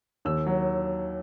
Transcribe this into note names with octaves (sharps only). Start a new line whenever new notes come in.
D#2 E6
F#3